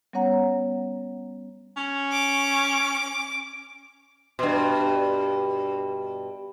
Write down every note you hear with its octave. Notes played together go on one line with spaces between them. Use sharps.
G3 B3 C#4 C#5 F#5 A#5
C#4
D6
G2 B2